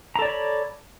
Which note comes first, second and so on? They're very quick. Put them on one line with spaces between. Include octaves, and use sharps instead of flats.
A#5 A4 D5 C#5 B5